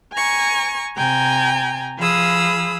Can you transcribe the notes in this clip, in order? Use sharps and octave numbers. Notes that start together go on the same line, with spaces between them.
G#5 A#5 C#6
C3 G5 G#5 A#5
F3 G#4 F5 B5 D#6 E6